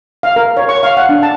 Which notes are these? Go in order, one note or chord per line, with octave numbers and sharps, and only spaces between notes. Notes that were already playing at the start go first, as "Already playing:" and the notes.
F5
A#4
C#5
C#6
F5
F#5
D4
A5